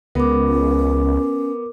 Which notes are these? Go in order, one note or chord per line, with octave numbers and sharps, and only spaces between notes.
C#2 B3 A#4 D6
C#4